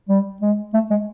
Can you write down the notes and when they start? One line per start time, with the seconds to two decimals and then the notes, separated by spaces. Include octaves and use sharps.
0.09 G3
0.42 G#3
0.74 A3
0.90 G#3